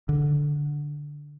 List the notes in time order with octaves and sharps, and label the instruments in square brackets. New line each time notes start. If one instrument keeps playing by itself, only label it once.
[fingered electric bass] D3